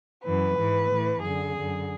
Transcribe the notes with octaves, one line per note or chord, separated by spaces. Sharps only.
F#2 E3 B4
G#2 E3
A2 E3
F#2 D3 G#4
F#2 D3